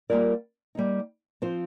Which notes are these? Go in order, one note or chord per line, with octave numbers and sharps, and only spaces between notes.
G3 A#3 F4 A#4 D5
G3 A#3 D#4
F3 C4 F4 C5